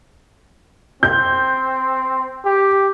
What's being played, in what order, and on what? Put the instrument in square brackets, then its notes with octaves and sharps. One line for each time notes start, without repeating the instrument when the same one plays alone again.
[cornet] C4 [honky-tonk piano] G6
[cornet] G4